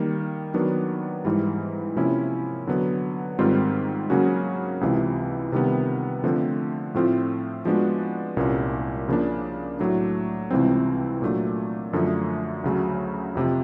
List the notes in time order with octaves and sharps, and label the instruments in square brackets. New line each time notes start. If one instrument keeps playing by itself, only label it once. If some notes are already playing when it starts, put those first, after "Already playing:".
Already playing: [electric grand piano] D#3 G3 A#3
D#3 F#3 B3 D4
G#2 E3 G3
C3 F3 A#3 C#4 E4
D3 F#3 B3
G#2 D#3 G3 C4 F4
C#3 F#3 A#3 C#4 F#4
C#2 C3 E3
C3 D#3 G3 B3
D3 F3 A3 C4
A2 F3 A3 C4 F4
F3 G#3 B3 D4 F#4
C2 A#2 G3 A#3 C#4
C#3 F3 A#3 D4
A2 F#3 A3 D4
C#2 C3 E3 G3 C4
A#2 F#3 A3 D4
F#2 D3 F3 A3
D2 C#3 F#3 A3
F2 C3 F3